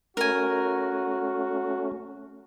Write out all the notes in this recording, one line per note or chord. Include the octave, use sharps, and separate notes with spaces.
A3 C#4 F#4 A#4 G#5